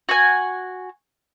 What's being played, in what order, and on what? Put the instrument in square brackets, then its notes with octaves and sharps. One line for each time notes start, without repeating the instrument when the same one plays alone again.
[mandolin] F#4 G#5